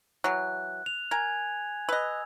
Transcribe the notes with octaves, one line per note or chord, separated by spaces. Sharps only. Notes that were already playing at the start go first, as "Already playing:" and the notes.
E3 F#3 F#6
F7
A#4 G#5 G#6
B4 D#5 E6